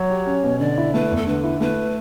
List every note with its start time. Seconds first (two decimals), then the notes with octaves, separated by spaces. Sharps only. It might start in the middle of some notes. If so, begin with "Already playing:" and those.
Already playing: F#3 C#5
0.10 G4
0.26 C#4
0.43 B2
0.60 D3 D5
0.78 E4
0.94 A3 B4
1.11 E2
1.16 A4
1.27 D3 B4
1.44 E4
1.61 A3 B4